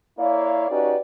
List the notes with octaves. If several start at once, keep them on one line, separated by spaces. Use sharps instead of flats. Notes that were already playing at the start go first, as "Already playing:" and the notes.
A#3 E4 C#5 D5 F5
C#4 D#4 F#4 G4 B4 D5